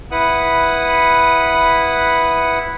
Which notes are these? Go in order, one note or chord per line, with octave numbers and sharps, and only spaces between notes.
E4 B4 F#5 B5 D#6